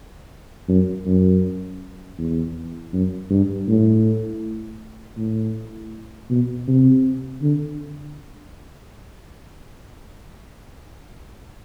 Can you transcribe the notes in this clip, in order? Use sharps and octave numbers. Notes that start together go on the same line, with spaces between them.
F#2
F#2
E2
F#2
G2
A2
A2
B2
C3
D3